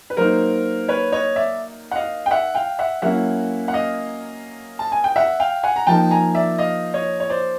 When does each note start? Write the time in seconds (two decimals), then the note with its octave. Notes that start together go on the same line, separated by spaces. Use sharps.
0.10 B4
0.17 F#3 A#3 D#4 A#4 C5
0.88 B4 C#5
1.12 C#5 D#5
1.36 D5 E5
1.91 F#5
1.95 D#5 F5
2.26 G5
2.31 E5 F#5
2.55 F5 G5
2.79 E5 F#5
3.02 F#3 A#3 C#4 E4 E5 F#5
3.68 F#5
3.73 D#5 F5
4.79 A5
4.92 G#5
5.04 G5
5.16 E5 F#5
5.40 F5 G5
5.63 F#5 G#5
5.76 A#5
5.87 F3 A#3 D#4 G5 A5
6.11 G#5 A#5
6.35 D5 E5
6.58 D#5 F5
6.94 C#5 D#5
7.20 C#5
7.29 C5 D5